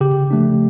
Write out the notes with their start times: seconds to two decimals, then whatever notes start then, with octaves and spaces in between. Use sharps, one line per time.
0.01 C#3 G4
0.31 F3 A3 D4